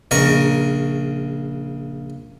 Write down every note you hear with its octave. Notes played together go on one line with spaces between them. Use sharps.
A#1 C#3 A#4 C#6